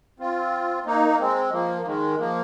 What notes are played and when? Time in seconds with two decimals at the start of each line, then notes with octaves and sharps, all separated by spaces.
0.20 C4 F4
0.86 A#3 D#4
1.08 A#3
1.20 G#3 C4
1.52 F3 A#3
1.82 A#3
1.85 D#3 G#3
2.18 F3 A#3